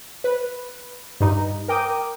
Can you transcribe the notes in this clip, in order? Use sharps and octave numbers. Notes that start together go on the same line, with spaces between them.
B4
G2 D#4
A#4 G5 D6 D#6